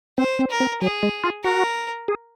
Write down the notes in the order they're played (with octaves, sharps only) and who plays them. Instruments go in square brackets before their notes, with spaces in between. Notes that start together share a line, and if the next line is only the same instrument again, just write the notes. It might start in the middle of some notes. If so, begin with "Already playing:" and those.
[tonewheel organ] C4 [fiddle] C5
[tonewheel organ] C4
[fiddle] A#4
[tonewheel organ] C4
[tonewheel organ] F#3 [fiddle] G#4
[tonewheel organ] G#3
F4
[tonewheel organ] F#4 [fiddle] A#4
[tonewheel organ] G#4